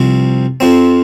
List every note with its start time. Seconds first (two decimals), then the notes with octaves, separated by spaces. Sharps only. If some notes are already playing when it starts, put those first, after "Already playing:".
Already playing: C2 C3 F3
0.60 F2 F3 C4